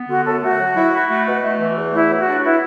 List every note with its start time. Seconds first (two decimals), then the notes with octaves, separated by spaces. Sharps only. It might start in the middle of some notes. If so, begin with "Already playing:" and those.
Already playing: B3
0.09 D3 F#4
0.25 F#2 A4
0.42 A3 F#4
0.58 F#3
0.75 E4
0.92 E4
1.09 A3
1.26 B2
1.43 A3
1.60 E3
1.76 E2
1.94 A3 E4
2.10 F#3
2.19 F#4
2.27 D4
2.44 B3 E4